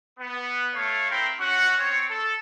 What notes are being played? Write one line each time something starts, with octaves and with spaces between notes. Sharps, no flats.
B3
A3 C#5 F5
C4 E4 A#4 G5 B5 C6
C#4 F#4 F#5
C4 C#5
A4